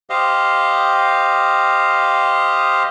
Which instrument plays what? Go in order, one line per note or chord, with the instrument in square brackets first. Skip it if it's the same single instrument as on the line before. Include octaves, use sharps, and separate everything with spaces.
[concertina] G4 C5 D#5 F5